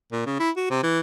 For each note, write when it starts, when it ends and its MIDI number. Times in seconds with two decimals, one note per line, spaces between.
0.12 0.21 46
0.26 0.35 49
0.39 0.50 64
0.57 0.68 66
0.70 0.81 48
0.83 1.00 52